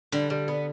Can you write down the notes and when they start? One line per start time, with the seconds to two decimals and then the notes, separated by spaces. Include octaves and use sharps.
0.12 D3 G3
0.30 G3
0.48 B3